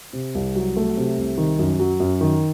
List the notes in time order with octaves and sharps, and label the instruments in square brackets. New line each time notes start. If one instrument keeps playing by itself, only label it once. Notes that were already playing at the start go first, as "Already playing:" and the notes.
[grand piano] C3
C2
F#3
A3
C3
C2
D#3
F#2
F#3
F#2
D#3